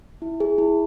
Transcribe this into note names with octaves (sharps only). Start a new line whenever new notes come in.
E4
G#4
E4